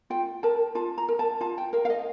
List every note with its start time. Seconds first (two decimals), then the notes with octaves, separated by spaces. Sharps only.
0.10 F4 G5
0.43 A#4 A5
0.75 F4 A5
0.98 A#5
1.08 A#4
1.19 A5
1.41 F4 A5
1.58 G5
1.73 A#4 F5
1.85 F5
1.90 D#5